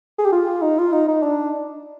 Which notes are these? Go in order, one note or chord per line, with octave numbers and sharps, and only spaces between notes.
G#4
G4
F4
D#4
F4
D#4
D#4
D4